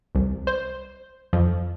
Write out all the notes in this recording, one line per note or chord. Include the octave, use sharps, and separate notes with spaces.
C2
C5
F2